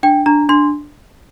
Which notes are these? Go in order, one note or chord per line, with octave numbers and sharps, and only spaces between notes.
D4 G5
D4 A#5
D4 C6